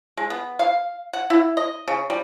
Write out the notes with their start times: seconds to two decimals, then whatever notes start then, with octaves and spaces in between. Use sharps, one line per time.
0.17 G#3
0.30 B3
0.59 F5
1.13 F#5
1.30 E4
1.57 D#5
1.88 C#3
2.10 G3